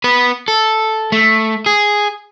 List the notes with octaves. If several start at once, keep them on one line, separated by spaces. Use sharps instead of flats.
B3 B4
A4
A3
G#4